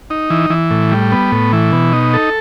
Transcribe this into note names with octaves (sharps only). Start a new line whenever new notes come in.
D#4
E3
E3
A2
G3
B3
A2
E3
B2
D#4
A4